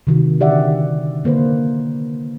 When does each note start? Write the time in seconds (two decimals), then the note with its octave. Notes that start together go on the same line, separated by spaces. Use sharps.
0.07 C3 D#3 F#4
0.40 D3 G4 D5 E5 F#5
1.24 D3 A#3 B4 C5